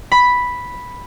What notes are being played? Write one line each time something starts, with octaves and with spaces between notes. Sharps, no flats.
B5